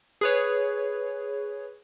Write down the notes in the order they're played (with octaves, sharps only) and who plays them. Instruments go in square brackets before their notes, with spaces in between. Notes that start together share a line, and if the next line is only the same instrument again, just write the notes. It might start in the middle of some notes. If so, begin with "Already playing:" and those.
[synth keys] G#4 B4 C#5